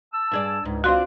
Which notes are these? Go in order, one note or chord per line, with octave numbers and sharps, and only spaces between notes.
A5 E6
G2 G#4 D5
C#2 G#2
C4 D4 F4 F#4 C6